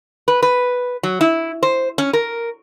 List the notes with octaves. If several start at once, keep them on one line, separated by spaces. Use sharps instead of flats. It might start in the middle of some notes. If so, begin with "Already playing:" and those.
B4
B4
F#3
E4
C5
C#4
A#4